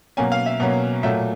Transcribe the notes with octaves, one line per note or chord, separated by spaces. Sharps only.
B2 F#3 A#3 C#4 G#5
F5
E5
B2 F#3 A#3 C#4
A#2 F#3 A3 E5